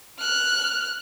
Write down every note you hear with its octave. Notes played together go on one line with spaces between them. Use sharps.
F6 F#6